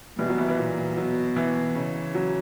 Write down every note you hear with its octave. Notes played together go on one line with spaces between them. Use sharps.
B2 E3 G3
F#3
E3
E3
A#2
B2 F#3
E3
C#3
F#3